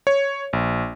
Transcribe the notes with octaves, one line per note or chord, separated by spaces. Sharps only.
C#5
A#1